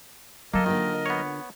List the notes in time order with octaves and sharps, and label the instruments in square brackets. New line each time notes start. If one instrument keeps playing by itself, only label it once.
[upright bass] F#3 [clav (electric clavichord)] A#3 A4 [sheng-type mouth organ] A#4 D#5
[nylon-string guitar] D3 A#3 F4 [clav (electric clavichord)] D#3
[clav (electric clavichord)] B3 C#5